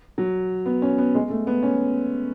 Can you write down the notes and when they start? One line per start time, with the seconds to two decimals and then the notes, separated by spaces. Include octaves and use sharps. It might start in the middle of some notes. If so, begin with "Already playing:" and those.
0.18 F#3
0.66 B3
0.82 C#4
0.98 B3
1.15 G#3
1.30 A3
1.47 B3
1.63 C#4